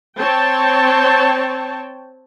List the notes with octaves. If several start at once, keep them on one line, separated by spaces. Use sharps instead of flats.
C4 C#5 G5 A5